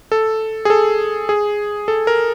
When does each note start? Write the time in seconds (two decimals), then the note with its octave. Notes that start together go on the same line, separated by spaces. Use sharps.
0.12 A4
0.65 G#4
0.70 A4
1.29 G#4
1.88 A4
2.07 A#4